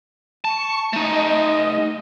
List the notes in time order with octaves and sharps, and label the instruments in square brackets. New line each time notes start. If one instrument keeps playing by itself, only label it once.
[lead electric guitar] A5 [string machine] C#6
[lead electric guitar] A3 D#4 [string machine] D#5